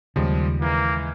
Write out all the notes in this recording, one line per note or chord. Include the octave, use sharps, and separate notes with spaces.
D#2 C#3 F3 G3 G#3
E3 G#3 A#3